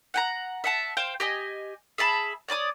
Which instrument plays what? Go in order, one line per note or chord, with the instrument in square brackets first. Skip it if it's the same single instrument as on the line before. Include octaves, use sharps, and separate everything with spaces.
[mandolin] F#5 G5 A#5
E5 F#5 A5
C5 F5 G5
G4 D#5 G#5
G#4 E5 A5 B5
C#5 D5 D6 D#6